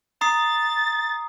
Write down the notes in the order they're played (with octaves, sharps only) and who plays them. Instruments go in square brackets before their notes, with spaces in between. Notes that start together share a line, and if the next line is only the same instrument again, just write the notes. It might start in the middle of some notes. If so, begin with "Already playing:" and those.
[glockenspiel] A#5 D#6 C7 [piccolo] A6